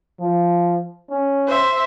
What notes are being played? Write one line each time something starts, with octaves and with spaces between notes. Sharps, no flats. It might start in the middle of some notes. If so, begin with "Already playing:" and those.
F3
C#4
C5 E5